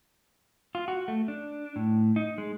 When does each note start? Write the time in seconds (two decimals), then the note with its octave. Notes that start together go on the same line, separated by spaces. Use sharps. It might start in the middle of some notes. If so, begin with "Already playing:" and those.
0.75 F4
0.88 F#4
1.08 A3
1.28 D4
1.76 A2
2.16 D#4
2.38 G#3